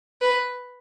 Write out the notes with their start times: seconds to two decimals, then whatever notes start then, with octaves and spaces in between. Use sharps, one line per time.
0.21 B4